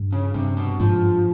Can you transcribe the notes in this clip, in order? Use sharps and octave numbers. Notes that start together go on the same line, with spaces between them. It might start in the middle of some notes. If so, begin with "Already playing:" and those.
Already playing: G2
C#3
G2 C3
B2
G#2 F3